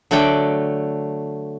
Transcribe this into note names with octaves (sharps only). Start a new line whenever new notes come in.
D3 F#3 A3 D5 G5